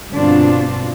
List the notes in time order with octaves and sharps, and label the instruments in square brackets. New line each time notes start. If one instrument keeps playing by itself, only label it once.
[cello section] G2 B2 D3 C4 D4 F4